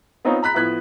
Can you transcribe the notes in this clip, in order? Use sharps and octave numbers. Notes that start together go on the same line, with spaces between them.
B3 C4 D#4 F4 C#5
A#5 B5 F#6 B6
A2 F3 B3 F#6 G#6 B6